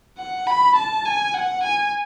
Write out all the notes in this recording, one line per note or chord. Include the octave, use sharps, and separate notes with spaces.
F#5
B5
A5
G#5
F#5
G#5